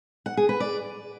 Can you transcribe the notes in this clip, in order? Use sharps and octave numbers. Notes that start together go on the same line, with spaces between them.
F#5
G#4
B4
D5